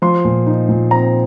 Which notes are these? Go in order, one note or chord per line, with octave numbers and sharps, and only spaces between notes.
F3 C6
A#2
D#4
A#2
C4 A#5